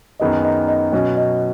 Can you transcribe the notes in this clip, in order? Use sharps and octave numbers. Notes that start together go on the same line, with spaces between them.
F#2 D#3 B3 D#4 G#4 D#5
D#5
D#5
B2 F#3 C#4 F#4 D#5
D#5